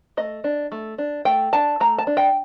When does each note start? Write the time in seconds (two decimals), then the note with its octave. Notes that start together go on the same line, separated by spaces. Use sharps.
0.17 A3 D#5
0.44 D4
0.72 A3
0.98 D4
1.25 A3 G5
1.53 D4 A5
1.80 A3 A#5
1.98 A5
2.07 D4
2.17 G5